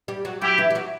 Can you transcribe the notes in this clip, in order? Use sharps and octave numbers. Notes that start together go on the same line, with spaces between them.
G3 G4
F#3 F#4
F#3 E4 F#4 G4
E3 E4
G4
F#3 F#4